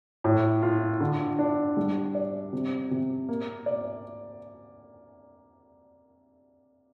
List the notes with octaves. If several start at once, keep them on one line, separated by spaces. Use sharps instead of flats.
A2
F4
D3
D4
G3
D5
C3
C3
A#3
D5